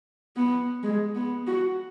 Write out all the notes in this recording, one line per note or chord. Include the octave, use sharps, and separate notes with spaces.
B3
G#3
B3
F#4